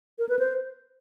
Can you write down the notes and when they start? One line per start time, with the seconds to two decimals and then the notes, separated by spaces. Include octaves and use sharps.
0.19 A#4
0.29 B4
0.39 C5